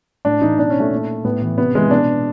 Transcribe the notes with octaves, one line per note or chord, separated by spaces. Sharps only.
A2 D4
E3 D#4
B2 D4
C#4
A3
A#2
A2 B3
E3
C3 B3
E3 G#3
B2 D4